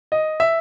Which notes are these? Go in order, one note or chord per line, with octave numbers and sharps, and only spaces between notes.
D#5
E5